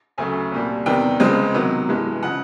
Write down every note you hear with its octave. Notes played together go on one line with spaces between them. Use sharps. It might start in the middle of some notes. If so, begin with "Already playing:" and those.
D2 C#3 F#3 A3 G#5
C2 A#2 G3
E2 C3 D#3 G3 G5
C#2 C#3 F3 G#3 C4
C3 D#3 F#3 B3
G2 E3 G#3
C#3 F3 F#5